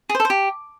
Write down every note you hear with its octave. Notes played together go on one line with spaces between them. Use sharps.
G#4
C5
A4
C5
G4